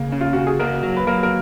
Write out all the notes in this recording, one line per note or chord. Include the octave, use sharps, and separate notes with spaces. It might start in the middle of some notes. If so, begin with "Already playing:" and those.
Already playing: C#3 A#3
C#4
F4
C#3 F#4
G#4
A#3 F#4 A#4
F#3
B4
F#3 A#3 A#4
A#3 A#4